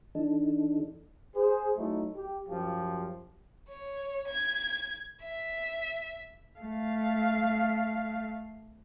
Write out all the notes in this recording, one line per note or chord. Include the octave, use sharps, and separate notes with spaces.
E3 D4 D#4 A4
G#4 C5
F#3 A3 D#4 E4
G4
F#2 F3 F4 G4
C#5
G#6
E5
A3 F5